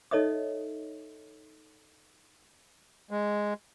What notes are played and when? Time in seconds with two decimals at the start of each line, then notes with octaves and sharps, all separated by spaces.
0.11 D#4 A4 C#5 D#5 E5 D#6
3.11 G#3